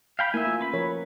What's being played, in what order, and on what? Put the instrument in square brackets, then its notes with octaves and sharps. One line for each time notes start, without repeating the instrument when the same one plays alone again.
[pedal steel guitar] F5 G5 B5
[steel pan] A3 A#3 E4 [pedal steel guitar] E5 G#5
[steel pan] F4
[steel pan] C#4 [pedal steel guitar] B4 B5
[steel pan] F3 A#4 C#5